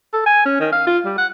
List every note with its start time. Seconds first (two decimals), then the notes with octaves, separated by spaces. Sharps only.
0.13 A4
0.26 G#5
0.45 C#4
0.60 D#3
0.72 F5
0.87 F4
1.05 G3
1.18 F#5